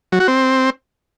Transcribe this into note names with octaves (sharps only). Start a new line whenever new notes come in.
F#3
F#4
C4